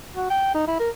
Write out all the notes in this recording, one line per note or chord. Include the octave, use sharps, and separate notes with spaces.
F#4
G5
D#4
E4
A#4